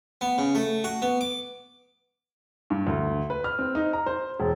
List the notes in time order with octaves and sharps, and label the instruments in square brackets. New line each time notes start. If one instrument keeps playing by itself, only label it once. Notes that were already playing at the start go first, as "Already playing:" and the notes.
[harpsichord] B3
C#3
A3
F#4
B3
D6
[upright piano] G2
D2
B4
F6
C4
D#4
A#5
C5
E1